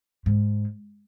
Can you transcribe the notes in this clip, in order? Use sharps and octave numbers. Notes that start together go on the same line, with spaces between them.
G#2